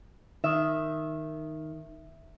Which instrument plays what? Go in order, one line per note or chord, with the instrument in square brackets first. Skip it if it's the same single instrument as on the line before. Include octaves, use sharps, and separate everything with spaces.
[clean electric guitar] D#3 [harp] E5